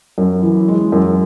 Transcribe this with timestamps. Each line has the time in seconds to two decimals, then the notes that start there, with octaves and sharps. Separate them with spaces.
0.18 F#2
0.43 E3
0.68 G#3
0.92 F#2